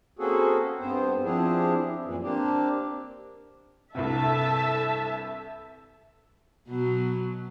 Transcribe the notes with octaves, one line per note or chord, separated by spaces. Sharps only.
A#3 C4 C#4 F#4 G#4 A4
G2 B3 C4 C5
F3 C4 D4 E4 G4 G#4
F#2 A#2 E3
A#3 C4 D4 G4
C2 G2 C3 A4 E5 A5
B2 F#3 B3